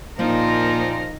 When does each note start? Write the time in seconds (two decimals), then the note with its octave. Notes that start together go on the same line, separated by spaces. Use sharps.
0.19 A#2 F3 A#3 D#4 A#4